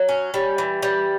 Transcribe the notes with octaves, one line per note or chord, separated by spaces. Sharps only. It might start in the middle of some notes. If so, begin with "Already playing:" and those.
Already playing: F#3
C#4
G3
E3
G3